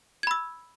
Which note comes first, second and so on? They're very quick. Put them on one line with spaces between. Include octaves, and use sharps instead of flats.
G#6 B5 E6